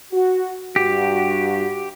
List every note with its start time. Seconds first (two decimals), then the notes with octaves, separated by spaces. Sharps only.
0.11 F#4
0.76 G2 F#4 G4